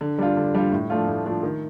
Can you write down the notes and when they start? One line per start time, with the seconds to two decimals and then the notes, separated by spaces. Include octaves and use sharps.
0.01 D3
0.18 G3 D4 F4
0.37 D3
0.54 G3 D4 F4
0.72 A2
0.90 F3 A3 D4 F4
1.08 A2
1.25 F3 A3 D4 F4
1.43 D#3